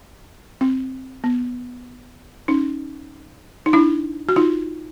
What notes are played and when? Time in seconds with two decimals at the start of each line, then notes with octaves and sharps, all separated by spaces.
0.61 C4
1.24 B3
2.48 C#4 D#4
3.66 D#4
3.73 D4 E4
4.29 F#4
4.36 D#4 F4